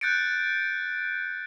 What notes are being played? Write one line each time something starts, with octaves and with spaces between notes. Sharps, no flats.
F#6 G6 A6 C#7 D7